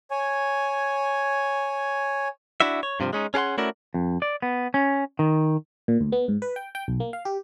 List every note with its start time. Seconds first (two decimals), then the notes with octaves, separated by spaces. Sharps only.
0.11 C#5 G#5
2.60 D4 E4 F#4 E5
2.83 C#5
3.00 G2 C3 F3
3.13 G#3 C#4 D#4
3.34 C#4 G#4 A#4 F#5 C6
3.58 A3 C#4 E4 F#4 A#4 D5
3.94 F2
4.22 D5
4.42 B3
4.74 C#4
5.19 D#3
5.88 A#2
6.01 D2
6.12 B3
6.28 G#2
6.42 B4
6.56 G5
6.75 G5
6.88 B1
7.00 A#3
7.13 F5
7.25 G4